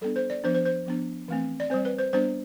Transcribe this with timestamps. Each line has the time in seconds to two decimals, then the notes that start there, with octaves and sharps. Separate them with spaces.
0.01 G3 B3 D4 A4
0.16 C5
0.30 D5
0.44 F3 B3 D4 C5
0.54 C5
0.65 C5
0.86 F3 B3 D4
1.28 E3 A3 C4
1.60 D5
1.70 C4 C5
1.74 G3
1.85 B4
1.98 C5
2.13 G3 B3 D4 C5